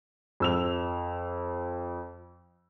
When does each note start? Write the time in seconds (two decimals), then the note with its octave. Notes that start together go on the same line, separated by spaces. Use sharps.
0.40 F2 E6 F7